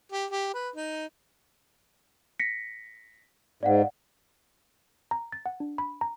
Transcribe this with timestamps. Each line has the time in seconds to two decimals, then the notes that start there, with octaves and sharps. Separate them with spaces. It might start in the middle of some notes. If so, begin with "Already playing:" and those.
0.12 G4
0.31 G4
0.54 B4
0.76 D#4
2.39 A#6 B6 C#7
3.63 G#2 D5 F5 F#5
5.11 A#5
5.32 A6
5.46 F#5
5.60 D4
5.78 B5
6.01 A#5